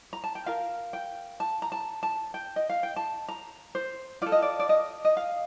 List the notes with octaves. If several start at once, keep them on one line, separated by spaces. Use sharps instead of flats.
A#5
A5
G5
F4 A#4 F5
G5
A5
A#5
A5
A5
G5
D#5
F5
G5
A5
A#5
C5
F4 A4 D5
D#5
D5
D5
D#5
D#5
F5